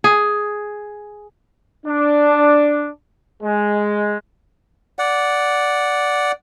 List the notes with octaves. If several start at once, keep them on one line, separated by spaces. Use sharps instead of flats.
G#4
D4
G#3
D5 F#5